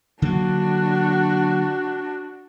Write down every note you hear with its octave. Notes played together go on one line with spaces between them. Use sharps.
D3 F#3 A#3 D4 F#4